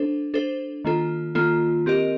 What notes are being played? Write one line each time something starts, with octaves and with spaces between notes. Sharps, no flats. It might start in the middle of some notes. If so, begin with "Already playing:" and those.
Already playing: D4 A4 C5
D4 A4 C5
D#3 A#3 F4 A4
D#3 A#3 F4 A4
C4 G4 A#4 D#5